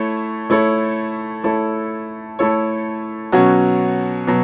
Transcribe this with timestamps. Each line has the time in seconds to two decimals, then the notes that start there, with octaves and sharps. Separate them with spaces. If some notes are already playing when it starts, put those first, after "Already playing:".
Already playing: A3 E4 A4 C#5
0.50 A3 E4 A4 C#5
1.44 A3 E4 A4 C#5
2.39 A3 E4 A4 C#5
3.32 B2 F#3 C#4 F#4
4.27 B2 F#3